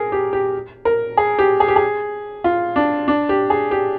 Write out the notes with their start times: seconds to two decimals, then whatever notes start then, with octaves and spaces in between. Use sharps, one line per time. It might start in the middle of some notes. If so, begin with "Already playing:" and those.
Already playing: G#4 A#4
0.12 G4
0.33 G4
0.85 A#4
1.17 G#4
1.39 G4
1.60 G#4
1.68 G4
1.76 G#4
2.44 F4
2.76 D4
3.08 D4
3.29 G4
3.50 G#4
3.71 G4